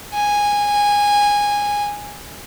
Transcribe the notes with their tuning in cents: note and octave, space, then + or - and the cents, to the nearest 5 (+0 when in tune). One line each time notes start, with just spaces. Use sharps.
G#5 -15